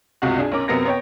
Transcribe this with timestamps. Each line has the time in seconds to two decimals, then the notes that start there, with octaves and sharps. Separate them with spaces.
0.22 G1 C#2 C3 F#4
0.38 D4 G#4
0.52 B1 C#4 A#4 D6
0.68 F#2 C3 B3 C4 A#4 A#6
0.85 B3 C#5 G5